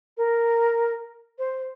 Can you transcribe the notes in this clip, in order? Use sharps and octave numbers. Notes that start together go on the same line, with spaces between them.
A#4
C5